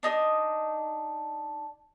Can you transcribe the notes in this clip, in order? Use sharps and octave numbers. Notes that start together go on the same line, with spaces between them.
D4 D#4 A4 D#5